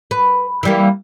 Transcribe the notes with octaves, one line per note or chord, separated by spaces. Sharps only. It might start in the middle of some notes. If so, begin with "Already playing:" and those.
B4
E3 G3 A#3